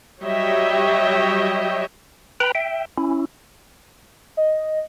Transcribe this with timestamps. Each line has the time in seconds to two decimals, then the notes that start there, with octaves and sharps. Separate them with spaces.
0.23 F#3 G3 C#5 D#5 E5 G5
2.40 B4 G5 A#5 B5
2.55 E5 G5
2.98 C#4 E4
4.37 D#5